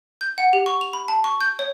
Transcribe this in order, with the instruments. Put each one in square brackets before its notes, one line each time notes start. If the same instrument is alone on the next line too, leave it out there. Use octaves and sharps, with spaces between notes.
[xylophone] G6
F#5
G4
C#6
F7
B5
A5
C#6
G6
C#5